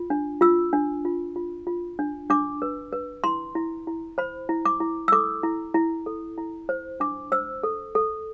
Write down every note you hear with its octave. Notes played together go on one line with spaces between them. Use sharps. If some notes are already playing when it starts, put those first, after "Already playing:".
Already playing: F4
D4
F4 E6
D4
F4
F4
F4
D4
D4 D6
B4
B4
E4 C6
E4
E4
C5 B5
E4
D6
E4
E6
A4 D6
E4
E4
A4
E4
C5
D4 D6
C5 E6
A4
A4